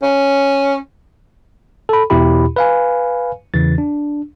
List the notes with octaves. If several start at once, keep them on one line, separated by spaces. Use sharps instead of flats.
C#4
A4 B5
E2 B2 E4 G4 B5
B4 F5 G#5
E2 C#3 E3 A6
D4